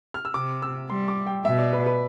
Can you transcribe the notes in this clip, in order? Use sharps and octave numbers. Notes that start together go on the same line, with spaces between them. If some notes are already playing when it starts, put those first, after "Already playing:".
F6
E6
C3 D6
E6
G3 C6
D6
G5
B2 E5
D5
B4
B4